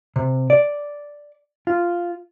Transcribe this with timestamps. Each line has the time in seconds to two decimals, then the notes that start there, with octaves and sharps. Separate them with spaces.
0.16 C3
0.50 D5
1.67 F4